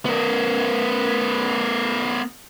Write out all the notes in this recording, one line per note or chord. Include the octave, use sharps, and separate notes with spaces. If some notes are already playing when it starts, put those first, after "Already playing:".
B3 A#4